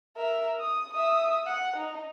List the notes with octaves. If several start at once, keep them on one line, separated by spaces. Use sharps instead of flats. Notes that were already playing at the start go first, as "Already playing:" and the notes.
A#4 E5
D#6
E5 D#6
F#5
D#4